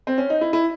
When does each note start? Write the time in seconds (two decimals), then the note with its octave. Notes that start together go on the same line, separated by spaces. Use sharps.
0.07 C4
0.18 C#4
0.30 D#4
0.41 E4
0.53 E4